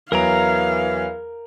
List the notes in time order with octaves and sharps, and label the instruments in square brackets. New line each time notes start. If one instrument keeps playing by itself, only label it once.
[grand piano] E2 F#3 D7 [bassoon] E3 [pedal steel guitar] A#4 A#5 [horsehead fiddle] F5